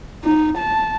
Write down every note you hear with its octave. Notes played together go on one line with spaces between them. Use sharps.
D#4
A5